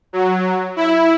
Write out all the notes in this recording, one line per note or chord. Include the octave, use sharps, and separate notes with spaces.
F#3
E4